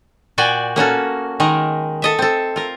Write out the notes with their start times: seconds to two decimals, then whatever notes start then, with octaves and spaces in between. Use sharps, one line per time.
0.38 A#2 F#4 D5 G5 G#5
0.76 A#3 C#4 F#4 A4
1.40 D#3 G#3 A#4
2.02 A4 D#5 E5
2.18 C4 A4
2.56 F4 A#4